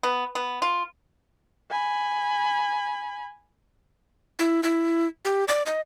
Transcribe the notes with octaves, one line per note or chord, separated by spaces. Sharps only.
B3
B3
F4
G#5 B5
E4
E4
G4
D5
D#5